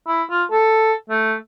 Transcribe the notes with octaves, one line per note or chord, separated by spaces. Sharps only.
E4
F4
A4
A3